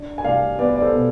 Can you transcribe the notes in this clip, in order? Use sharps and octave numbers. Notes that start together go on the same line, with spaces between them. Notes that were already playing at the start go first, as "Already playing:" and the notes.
Already playing: D4
G#5
C2 D5 F5
B3 B4 D5
D5
A4 C5
B2